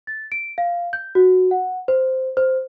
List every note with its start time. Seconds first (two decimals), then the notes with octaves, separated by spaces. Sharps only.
0.07 A6
0.32 D7
0.58 F5
0.93 G6
1.15 F#4
1.51 F#5
1.88 C5
2.37 C5